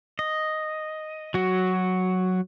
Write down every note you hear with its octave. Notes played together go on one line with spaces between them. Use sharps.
D#5
F#3 F#4